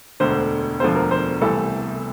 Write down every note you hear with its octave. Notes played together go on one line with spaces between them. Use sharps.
E1 D2 D3 C5
E1 D2 D3 F3 C5
A#4
C5
C2 C3 E3 A3 A4